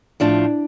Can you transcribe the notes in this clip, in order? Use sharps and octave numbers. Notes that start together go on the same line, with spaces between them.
A2 F3 D4